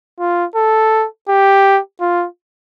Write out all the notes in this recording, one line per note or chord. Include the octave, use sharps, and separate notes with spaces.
F4
A4
G4
F4